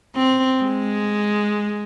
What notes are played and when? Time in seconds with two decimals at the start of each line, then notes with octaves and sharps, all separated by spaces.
0.15 C4
0.63 G#3